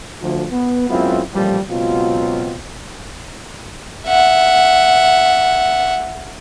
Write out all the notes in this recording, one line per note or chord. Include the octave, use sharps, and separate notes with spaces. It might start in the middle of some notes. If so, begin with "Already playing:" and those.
D2 F3
B3
F#2 G#3 B3 C4 E4 F4
A1 A#2 F3 G3
C#2 B2 F#3 C4 F4
E5 F#5